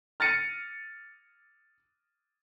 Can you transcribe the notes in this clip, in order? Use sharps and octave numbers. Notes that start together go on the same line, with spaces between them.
F6 A6 A#6 C#7 D#7